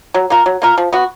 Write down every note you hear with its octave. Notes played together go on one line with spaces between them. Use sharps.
F#3
A#3 F4 A#4
F#3
A#3 F4 A#4
F3
B3 F#4